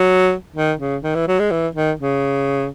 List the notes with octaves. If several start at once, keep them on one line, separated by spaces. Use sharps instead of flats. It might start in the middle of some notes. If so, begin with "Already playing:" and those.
Already playing: F#3
D#3
C#3
D#3
E3
F#3
G#3
E3
D#3
C#3